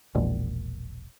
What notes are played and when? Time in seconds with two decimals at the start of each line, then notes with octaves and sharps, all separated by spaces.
0.15 E1 A#1